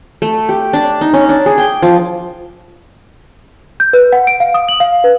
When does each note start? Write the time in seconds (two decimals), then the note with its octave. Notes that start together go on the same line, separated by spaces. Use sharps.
0.22 A3
0.49 G4
0.73 D4
1.01 D#4
1.13 C#4
1.29 D4
1.46 G#4
1.58 G5
1.82 F3
3.80 G6
3.93 B4
4.12 F#5
4.27 D7
4.40 F5
4.54 D#6
4.69 F#7
4.80 F5
5.04 B4